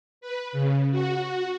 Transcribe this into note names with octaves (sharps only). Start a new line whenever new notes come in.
B4
C#3
F#4